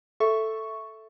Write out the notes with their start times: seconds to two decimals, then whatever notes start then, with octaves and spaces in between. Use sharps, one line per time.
0.20 A4 E5 C#6